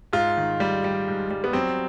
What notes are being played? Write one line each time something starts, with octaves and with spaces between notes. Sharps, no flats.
G#2 F4
D#3
G3
G3
G#2
G3
B3
F#3 C4